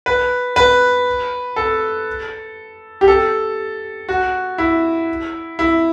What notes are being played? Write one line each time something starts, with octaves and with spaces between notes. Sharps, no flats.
B4
B4
A4
G4
A4
F#4
E4
E4